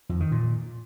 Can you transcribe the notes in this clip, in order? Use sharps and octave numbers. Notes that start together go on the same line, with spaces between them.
F2
D#3
A#2